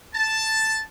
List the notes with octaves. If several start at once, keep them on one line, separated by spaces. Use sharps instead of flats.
A5